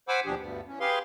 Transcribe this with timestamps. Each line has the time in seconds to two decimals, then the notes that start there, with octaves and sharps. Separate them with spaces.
0.08 C5 F#5 G#5 B5 D6 E6
0.26 D#2 B2 F3 D4 G4 G#4
0.40 D2 G2 B3
0.68 E3 C#4
0.80 G4 G#4 B4 F5 C6